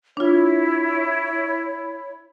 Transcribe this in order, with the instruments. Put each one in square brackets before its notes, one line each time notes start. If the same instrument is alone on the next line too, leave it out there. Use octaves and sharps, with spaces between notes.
[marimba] D4 F4 [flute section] E4 C#5